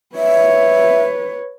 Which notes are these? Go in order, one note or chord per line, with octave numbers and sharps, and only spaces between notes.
B4 C#5 E5